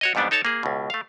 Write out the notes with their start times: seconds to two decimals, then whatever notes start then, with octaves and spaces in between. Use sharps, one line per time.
0.01 F#4 C#5 D#5
0.15 F2 G#2 G3 B3 D4
0.31 D#4 A4 C#5 A5
0.45 A#3 G#4
0.63 C#2 B2
0.90 A3 F5